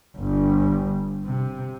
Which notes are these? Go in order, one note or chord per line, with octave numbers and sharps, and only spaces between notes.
G1 G2
C3